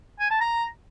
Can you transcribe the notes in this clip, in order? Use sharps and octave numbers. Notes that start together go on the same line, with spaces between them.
G#5
A5
A#5